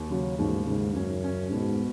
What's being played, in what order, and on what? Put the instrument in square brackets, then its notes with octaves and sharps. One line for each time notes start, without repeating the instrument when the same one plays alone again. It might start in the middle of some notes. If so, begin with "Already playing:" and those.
Already playing: [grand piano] D#2
[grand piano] C#3 [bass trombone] F#3
[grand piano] D#2 [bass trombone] G#2
[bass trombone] G#2 [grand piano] C#3
[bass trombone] F#2 [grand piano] C#4
[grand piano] C#4
[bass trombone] G#2 [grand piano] B2